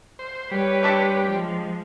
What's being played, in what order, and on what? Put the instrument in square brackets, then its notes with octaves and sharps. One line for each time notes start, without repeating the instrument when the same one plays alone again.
[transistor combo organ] C5
[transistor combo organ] G3 [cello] B4 C#5
[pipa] C4 D4 G4
[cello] F3 G#3